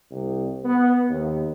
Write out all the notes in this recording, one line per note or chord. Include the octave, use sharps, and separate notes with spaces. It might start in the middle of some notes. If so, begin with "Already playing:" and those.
C2
B3
D#2